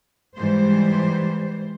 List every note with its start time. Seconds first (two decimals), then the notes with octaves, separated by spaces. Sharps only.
0.36 G#2 E3 G3 C5